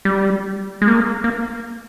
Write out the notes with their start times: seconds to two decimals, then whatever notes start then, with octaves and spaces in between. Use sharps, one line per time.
0.05 G3
0.82 G#3
0.88 A#3
1.24 A#3